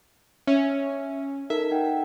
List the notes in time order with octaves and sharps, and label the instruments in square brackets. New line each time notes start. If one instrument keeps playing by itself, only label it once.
[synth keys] C#4 [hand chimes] E5
[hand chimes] D#4 A4 A#4 [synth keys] E5
[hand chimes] D#4 F#5 G5